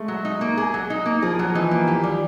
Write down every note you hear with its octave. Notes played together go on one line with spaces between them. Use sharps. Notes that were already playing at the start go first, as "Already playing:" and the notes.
Already playing: G#3 A3
F#3
D#4
A#3
G#4
F#3
D#4
A#3
F3 G#4
F#3
E3 D#4
A#3
D#3 G4
G3